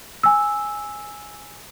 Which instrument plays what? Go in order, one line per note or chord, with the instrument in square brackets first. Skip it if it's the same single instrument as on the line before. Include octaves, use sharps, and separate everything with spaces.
[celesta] G#5 E6